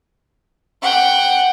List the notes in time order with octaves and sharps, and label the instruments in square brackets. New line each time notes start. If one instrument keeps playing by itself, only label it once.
[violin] F#5 G5